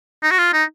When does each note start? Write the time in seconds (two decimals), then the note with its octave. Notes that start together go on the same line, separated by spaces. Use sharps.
0.23 D#4
0.31 F#4
0.38 F4
0.53 D#4